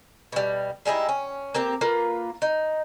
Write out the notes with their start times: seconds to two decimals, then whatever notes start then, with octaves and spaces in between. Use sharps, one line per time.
0.32 B2 G3
0.85 G3 G#3 D#4 E4
1.09 C#4
1.54 A#3 C4 G4
1.81 A#3 F4 B4
2.42 D#4